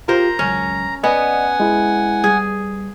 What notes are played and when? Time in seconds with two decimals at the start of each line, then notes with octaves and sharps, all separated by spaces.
0.08 F4 G4 A#4 C5 A#5
0.39 G#1 C#2 F#3 C#4
1.04 B3 D5 D#5 F#5 G#5
1.60 G#3 E4
2.24 G3 G#4